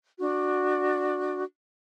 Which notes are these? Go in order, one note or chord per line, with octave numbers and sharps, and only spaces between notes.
D4 F#4